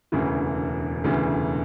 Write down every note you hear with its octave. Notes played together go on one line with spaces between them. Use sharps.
E1 D2 C#3 E3
E1 D2 C#3 E3